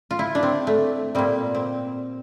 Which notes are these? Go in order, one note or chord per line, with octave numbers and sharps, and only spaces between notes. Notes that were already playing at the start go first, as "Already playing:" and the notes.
F4
E4
D4
C4
A3
A#2 G3 C4
C4